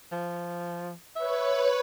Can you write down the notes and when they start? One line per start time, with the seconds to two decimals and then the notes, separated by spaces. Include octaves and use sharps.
0.12 F3
1.16 B4 C#5 E5